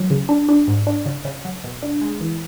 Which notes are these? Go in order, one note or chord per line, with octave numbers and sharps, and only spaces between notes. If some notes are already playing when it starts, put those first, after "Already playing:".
Already playing: F#3
C#3
D4
D4
G#2
D4
C#3
C#3
F#3
B2
D4
G#3
E3